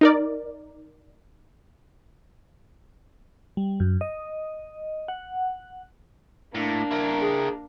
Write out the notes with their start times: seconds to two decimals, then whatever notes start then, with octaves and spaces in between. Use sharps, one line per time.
0.01 D#4 A#4 D5
3.57 G3
3.80 F#2
4.01 D#5
5.08 F#5
6.55 A2 A#3 D4
6.91 E4 A#4
7.21 G#4